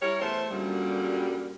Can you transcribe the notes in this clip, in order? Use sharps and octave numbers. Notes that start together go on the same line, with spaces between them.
G3 E4 A#4 C#5
E2 A3 C5
F#2 A#2 D3 G3